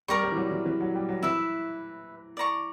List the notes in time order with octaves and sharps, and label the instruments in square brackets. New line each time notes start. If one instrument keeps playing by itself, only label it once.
[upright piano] G3 [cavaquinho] A#4 D5 A#5 C#6
[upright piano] G3
E3
F#3
E3
E3
F#3
G3
F#3
[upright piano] E3 [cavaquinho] E4 B4 E5
[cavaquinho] D5 A#5 C#6